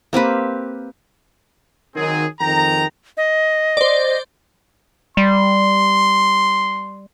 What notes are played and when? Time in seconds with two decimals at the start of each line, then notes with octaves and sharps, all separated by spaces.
0.13 A#3 C4 G4 B4
1.95 D#3 F#3 C4 G#4
2.40 F2 D#3 G#4 G5 A#5
3.17 D#5
3.77 C5 D5
5.17 G3 C6